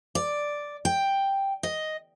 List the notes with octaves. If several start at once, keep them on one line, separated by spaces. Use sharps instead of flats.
D5
G5
D#5